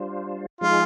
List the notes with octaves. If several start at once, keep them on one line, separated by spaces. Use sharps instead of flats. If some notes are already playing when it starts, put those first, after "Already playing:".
Already playing: G3 D4 F4 C5
F3 G#3 D#4 F4 G#4